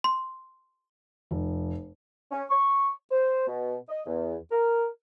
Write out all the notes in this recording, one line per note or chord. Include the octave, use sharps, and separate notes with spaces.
C6
F1
C#4
C#6
C5
B2
D#5
E2
A#4